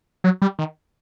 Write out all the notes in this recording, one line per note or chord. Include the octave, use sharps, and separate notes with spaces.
F#3
G3
D#3